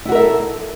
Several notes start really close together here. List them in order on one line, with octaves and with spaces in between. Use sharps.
E4 F#4 A#4 E5 A4